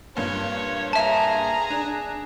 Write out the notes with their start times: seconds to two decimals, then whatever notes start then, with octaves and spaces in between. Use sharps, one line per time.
0.17 G2 A#2 C#5
0.93 G#4 E5 A5 A#5
1.70 D4